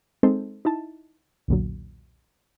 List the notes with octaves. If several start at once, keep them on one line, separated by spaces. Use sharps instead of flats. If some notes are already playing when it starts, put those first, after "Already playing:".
G#3 C4 D#4 A4 C5
D#4 E4 A5
B1 E2 A#2 D3 F#3